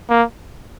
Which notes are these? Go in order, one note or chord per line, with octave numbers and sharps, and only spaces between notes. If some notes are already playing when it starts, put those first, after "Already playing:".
A#3